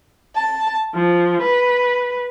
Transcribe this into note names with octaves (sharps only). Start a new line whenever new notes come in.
A5
F3
B4